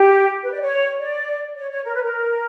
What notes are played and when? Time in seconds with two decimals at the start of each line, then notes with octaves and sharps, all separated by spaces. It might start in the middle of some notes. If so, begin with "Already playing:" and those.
Already playing: G4
0.42 B4
0.51 D5
0.61 C#5
0.98 D5
1.56 C#5
1.70 C#5
1.84 A#4
1.93 B4
2.02 A#4